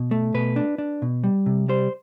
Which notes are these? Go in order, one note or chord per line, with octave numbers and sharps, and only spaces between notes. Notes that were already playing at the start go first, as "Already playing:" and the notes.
Already playing: B2
A3
B2 B4
D4
D4
B2
G3
C3
G3 C5